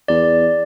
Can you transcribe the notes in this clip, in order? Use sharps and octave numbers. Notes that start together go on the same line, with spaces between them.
E2 D5